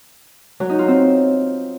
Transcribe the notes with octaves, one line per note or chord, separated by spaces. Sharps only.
F#3
D#4
F4
C4